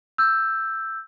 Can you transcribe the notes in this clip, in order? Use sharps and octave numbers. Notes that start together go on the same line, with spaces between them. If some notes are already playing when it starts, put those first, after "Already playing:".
E6 G6